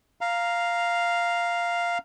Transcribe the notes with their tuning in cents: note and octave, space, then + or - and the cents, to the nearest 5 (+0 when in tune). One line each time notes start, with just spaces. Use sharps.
F5 +0 A#5 +0